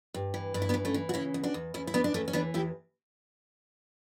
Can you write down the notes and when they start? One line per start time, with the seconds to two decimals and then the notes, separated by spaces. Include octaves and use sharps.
0.14 G2
0.34 E3
0.54 G2 D4
0.62 E4
0.69 B3 D4
0.74 E3
0.85 A3 C#4
0.94 E3
1.09 F#4
1.14 C#3 C#4 E4
1.34 E2
1.44 D4 F#4
1.54 E2
1.74 E2 C#4 E4
1.87 E4
1.94 E2 B3 D4
2.04 D4
2.14 E2 A3 C#4
2.28 C#4
2.33 E3 B3 D4
2.54 E2 E4 G4